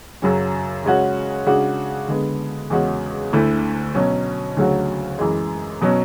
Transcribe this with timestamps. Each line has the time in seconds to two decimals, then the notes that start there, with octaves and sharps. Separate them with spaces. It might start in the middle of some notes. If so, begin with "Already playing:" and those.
0.22 F#2 C#3 F#3 C#4
0.84 C#3 G#3 C#4 F#4
1.46 C#3 G#3 D4 F#4
2.08 D3 G#3 B3
2.70 E2 C#3 G#3 C#4 F#4
3.33 D2 D3 A3 E4
3.95 B2 F#3 C#4
4.57 D2 C#3 F#3 C#4 F#4
5.19 F#2 E3 G#3
5.82 B2 F#3 C#4